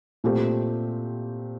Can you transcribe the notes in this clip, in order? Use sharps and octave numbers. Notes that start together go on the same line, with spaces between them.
A#2 A3 C4 G4